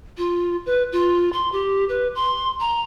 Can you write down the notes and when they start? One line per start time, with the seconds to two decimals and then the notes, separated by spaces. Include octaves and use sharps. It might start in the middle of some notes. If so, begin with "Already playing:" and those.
0.18 F4
0.66 B4
0.92 F4
1.33 C6
1.52 G4
1.89 B4
2.15 C6
2.60 A#5